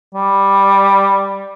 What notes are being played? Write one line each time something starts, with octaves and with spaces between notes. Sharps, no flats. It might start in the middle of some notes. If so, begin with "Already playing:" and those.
G3